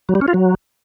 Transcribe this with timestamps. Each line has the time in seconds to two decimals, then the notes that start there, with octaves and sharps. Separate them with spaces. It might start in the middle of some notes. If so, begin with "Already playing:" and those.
0.09 F#3
0.15 G3
0.21 C#4
0.28 F4
0.34 F#3